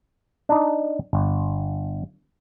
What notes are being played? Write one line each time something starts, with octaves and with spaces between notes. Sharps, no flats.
D4 D#4
G1